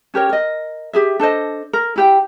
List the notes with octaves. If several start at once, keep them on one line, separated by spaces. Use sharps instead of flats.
C#4 G4 A#4 C#5
A#4 D#5
G4 G#4 E5
D4 A4 C5 D#5
A#4
E4 G4 G5